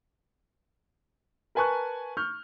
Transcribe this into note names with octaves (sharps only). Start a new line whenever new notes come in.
A#4 B4 G#5 A5 C#6 F#6
C#6 F6 G6